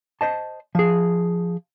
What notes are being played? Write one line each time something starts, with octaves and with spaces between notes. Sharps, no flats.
C5 D#5 A5
F3 G#4